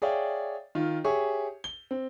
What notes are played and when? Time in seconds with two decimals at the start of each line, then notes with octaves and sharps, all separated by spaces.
0.02 G#4 C#5 D5 E5 F5 G5
0.75 D#3 F4
1.04 G4 G#4 C#5 E5 C#6
1.64 G7
1.91 C4